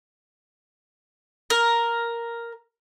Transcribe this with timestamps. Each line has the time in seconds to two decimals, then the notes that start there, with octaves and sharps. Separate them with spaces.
1.50 A#4